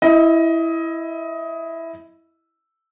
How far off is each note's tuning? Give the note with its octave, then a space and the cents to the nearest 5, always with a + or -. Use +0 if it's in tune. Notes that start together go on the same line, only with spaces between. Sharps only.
E4 +0 D#5 +20